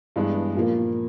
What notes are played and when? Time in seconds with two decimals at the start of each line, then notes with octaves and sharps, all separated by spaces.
0.16 G2 E3 G#3 B3 D4
0.55 A#2 F3 A#3